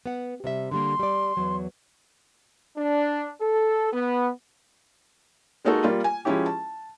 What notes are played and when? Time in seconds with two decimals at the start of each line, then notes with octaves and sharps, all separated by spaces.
0.06 B3 F#5
0.44 C3 G3 E5
0.71 D3 G3 A#3 C6
0.99 G3 D5
1.37 E2 F#3
2.77 D4
3.41 A4
3.93 B3
5.65 G#3 A#3 D#4 F#4 A4
5.84 G3 A#3 F4
6.04 G#5
6.25 F3 G#3 C#4 E4 G4
6.46 A5